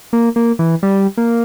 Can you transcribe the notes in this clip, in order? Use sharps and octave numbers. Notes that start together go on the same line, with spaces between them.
A#3
A#3
E3
G3
A#3